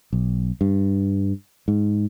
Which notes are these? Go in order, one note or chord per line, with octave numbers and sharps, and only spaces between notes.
B1
G2
G#2